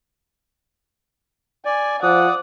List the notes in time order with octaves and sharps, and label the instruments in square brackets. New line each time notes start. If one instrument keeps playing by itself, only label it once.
[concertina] D5 [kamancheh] G#5
[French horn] F3 [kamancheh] D5 [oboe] F#5 [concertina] D#6